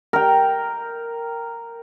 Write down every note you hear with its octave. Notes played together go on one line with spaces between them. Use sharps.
A#4 G5